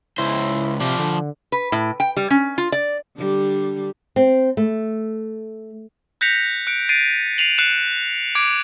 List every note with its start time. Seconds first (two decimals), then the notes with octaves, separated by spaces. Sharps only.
0.18 C#2 E4 C5
0.80 C3 F3 D5
0.99 D3
1.52 B4
1.72 A2
2.00 G5
2.17 G3
2.30 C#4
2.58 F4
2.72 D5
3.17 D3 G3 D4
4.16 C4
4.57 A3
6.21 F#6 G6 A#6 B6 C#7 F7
6.67 F#6 C#7 D7
6.89 A6 C7 D7 D#7
7.38 C7 D#7 F7 F#7
7.58 F#6 C7 C#7 E7
8.35 D6 G#6 D7